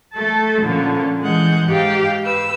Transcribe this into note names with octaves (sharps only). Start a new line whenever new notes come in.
A3 A4 A5
A#2 D3 F3 C#4
E3 G#3 F#5 G6
G#2 G4 F5 G5
B4 E6